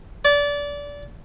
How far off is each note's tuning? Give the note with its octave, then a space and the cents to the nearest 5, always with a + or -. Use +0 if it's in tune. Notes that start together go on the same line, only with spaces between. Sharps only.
D5 -25